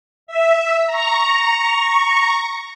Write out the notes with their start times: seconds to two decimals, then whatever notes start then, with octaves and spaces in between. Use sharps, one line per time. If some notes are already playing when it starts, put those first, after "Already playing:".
0.27 E5
0.86 A#5 C#6